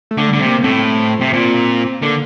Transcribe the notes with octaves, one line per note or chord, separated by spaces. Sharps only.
A3
D3
D3 G3
C3
A#3
A2 C4
C3
A#2 C4
D3 A#3